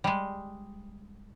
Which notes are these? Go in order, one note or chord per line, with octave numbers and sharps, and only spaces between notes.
G3 G#3